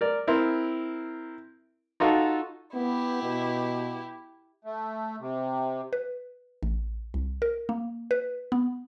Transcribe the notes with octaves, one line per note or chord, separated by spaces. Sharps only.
A#4 D5
C4 E4 A#4
D#4 F4 F#4 A4
B3 E4 G4
B2
A3
C3
B4
A1
C2
A#4
A#3
B4
B3